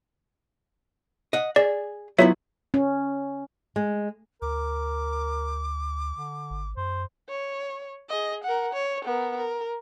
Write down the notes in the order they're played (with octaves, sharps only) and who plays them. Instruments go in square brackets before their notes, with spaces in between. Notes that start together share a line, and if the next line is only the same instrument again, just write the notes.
[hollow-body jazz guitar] D#5 F#5
[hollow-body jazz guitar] G#4 [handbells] D5
[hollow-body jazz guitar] F#3 B3 E4 [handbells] F4 C#5 E5
[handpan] C#4
[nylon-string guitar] G#3
[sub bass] D2 [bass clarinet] A#4 [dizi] D6
[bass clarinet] D3
[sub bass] G#1
[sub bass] F#2 [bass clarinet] C5
[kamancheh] C#5
G#4 D#5
A#4 F#5
C#5
B3 A#4
A#4